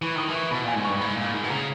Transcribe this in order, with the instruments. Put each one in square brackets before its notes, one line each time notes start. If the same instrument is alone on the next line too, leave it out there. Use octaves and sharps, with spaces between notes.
[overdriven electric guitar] E3 [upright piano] C#6
[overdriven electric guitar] D#3 [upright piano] D#6
[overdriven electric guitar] E3
[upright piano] C#6
[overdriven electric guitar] B2 [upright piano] B5
[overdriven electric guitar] A#2 [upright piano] G#5
[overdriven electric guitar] G#2
[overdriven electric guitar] G2 [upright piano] C#6
[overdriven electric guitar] G#2 [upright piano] B5
[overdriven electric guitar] A#2
G#2
B2
[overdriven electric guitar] C#3 [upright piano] A#5